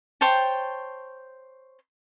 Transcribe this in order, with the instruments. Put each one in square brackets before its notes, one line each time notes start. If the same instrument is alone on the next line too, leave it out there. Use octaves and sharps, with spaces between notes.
[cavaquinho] C5 C#5 G5 A5